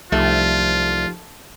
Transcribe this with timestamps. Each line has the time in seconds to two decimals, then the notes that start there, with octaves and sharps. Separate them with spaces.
0.12 C2 F3 A3 D#4 F4 G4